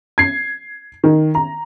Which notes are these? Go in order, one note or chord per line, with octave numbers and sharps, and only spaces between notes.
G#6 C7
D#3
A#5